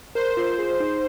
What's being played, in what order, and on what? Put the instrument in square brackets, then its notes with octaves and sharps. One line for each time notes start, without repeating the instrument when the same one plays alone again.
[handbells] A#4 [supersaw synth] C5
[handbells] F4
G#4
D#4